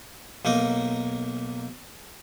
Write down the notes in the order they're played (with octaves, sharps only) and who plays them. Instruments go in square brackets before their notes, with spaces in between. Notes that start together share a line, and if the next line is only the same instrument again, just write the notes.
[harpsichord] B1 A#3 D#4 D#5